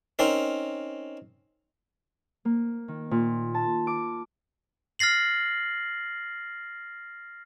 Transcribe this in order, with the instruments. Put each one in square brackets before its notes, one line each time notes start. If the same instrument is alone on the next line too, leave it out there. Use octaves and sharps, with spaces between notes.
[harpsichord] C4 C#4 D#4 A#4
[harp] A#3
D#3
A#2
A5
D6
[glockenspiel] F6 A6 A#6 C7 F#7